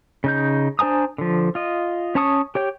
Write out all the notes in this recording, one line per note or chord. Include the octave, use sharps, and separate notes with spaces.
C#3 D#4 G6
D4 C5 G#5 A#5 D#6
D3 F3
F4 D#5
C#4 C#5 A5 C#6 D#6
G4 C#5 G5